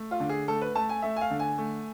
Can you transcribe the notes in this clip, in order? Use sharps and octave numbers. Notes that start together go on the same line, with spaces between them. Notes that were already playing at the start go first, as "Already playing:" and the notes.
Already playing: A3
F4
D3
G#4
A3 A4
B4
A3 A5
G#5
A3 E5
G#5
F5
D3
G#5
A3